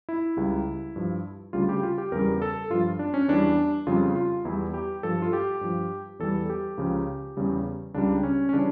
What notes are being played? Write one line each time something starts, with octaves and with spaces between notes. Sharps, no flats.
E4
C#2 C#3 G3
G2 F3
D2 C#3 G3 F4
G4
F4
G4
E2 C#3 G3 A#4
A4
G2 F3 F4
D4
C#4
E2 E3 G3 D4
F2 C#3 G3 F4
F4
E2 E3 G3 E4
G4
G2 F3 A4
F4
G4
G2 F3
E2 E3 G3 A4
G4
C#2 C#3 F3
E2 C#3 G3
C#2 C#3 G3 D4
C#4
C#4
C#3 E3 G3 D4